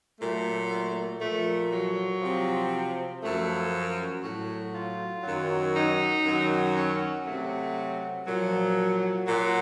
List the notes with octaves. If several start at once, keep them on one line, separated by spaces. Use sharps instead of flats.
A#2 F#3 A3
A3
A#2 F3 A3
F#3
C3 F3
F#2 F3 A3
A2 F#3 F#4
F4
F#2 D#3 F#3
D#4
F#2 D#3 F#3
C#4
C3 F#3 A3
A#2 F3 F#3
A#2 F#3